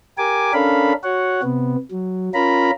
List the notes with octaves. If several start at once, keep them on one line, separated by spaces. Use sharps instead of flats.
G4 A#4 G#5 D6
C#4 D4 A4 A#4 F5 B5
F#4 C#5 F#5
C3 B3
F#3
C#4 F4 A#4 A#5 B5